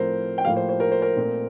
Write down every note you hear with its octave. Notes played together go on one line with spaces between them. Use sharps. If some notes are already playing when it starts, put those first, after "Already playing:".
Already playing: A2 F3 C4 A#4 C5
G5
A2 F3 A#3 F5
C5
C5
A#4
C5
A#4
A#2 A3 C4